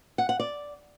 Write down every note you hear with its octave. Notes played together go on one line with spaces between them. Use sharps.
F#5
F#5
D5